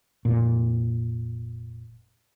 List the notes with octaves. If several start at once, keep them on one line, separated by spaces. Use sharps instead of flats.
F1 A#2